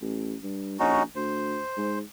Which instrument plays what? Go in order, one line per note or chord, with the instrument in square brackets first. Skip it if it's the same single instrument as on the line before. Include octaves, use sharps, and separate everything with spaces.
[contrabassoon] A1
G2
[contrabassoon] A#1 [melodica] C#4 D#4 F#4
[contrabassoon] D2 [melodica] C5
[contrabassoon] G#2